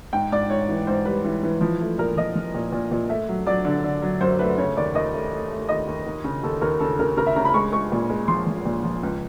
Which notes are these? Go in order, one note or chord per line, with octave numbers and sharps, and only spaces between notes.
G#2 G5
G#2 D5
G#2 C#5
E3
G#2 C5
G3 B4
E3
E3
F3
A3
A#2 A#4
F3 D#5
F3
A#2
A#2
A#2
A3 E5
F#3
F#3 D5
D3
D3
F#3
F#2 C5
A3 B4
C#3 C#5
D#2 D5
D#2 D#5
A3
A3
A3
D#2 D#5
D#2
D#2
C#3
D#2 A4
D#2 A#4
C#3 A4
C#3 A#4
C#3 A#4
E5
C#3 A#5
B5
G#3 C#6
G#3 C#6
A#2
G#3
F3 C6
F3
A#2
F3
C#2